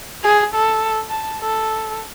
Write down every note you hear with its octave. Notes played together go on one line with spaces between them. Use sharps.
G#4
A4
A5
A4